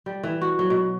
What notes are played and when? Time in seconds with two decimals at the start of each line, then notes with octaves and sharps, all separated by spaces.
0.06 G3
0.23 E3
0.41 F#4
0.59 F#3
0.70 B2